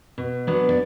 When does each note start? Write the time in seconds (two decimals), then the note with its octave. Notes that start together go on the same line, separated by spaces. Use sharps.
0.18 B2
0.47 F#3 B3 D4
0.69 D5